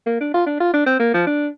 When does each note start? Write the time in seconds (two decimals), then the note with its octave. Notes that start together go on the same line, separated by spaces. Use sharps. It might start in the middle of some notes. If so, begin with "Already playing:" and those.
0.06 A#3
0.21 D4
0.34 F4
0.46 D4
0.60 F4
0.73 D4
0.86 C4
0.99 A#3
1.14 F3
1.27 D4